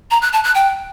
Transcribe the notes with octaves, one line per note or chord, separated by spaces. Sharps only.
A#5
F#6
A5
F#6
G5